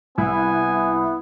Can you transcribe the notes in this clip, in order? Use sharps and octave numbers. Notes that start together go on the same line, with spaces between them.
C2 B3 E4 G#5